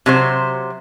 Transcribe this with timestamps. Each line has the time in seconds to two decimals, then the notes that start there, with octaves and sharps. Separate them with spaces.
0.06 C3 F#3 C5